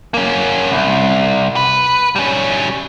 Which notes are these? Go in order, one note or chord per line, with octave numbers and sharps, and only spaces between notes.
A#3 C#4
C2
B4
G3 C#4